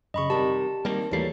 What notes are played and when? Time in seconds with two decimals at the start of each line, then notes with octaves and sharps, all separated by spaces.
0.14 F#2 C#3 D#5 B5 C#6
0.30 C3 D#3 G3 G4 A5
0.85 D#3 G3 A#3 C4
1.11 D#2 E3 F#3 G3 A3 A#3 C7